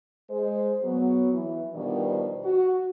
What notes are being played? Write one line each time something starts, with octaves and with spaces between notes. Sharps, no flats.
G#3 C5
F#3 B3
E3
B2 D#3 F3 G3 B3 D4
F#4